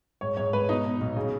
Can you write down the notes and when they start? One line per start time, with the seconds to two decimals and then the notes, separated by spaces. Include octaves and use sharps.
0.21 G#2 C#5
0.37 G#2 C#5
0.53 G#2 B4
0.69 B2 D#4
0.85 B2
1.01 B1
1.16 C#3